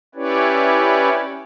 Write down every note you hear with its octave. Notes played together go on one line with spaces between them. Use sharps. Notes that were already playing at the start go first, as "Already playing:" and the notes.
C#4 E4 G4 B4 C#5 D5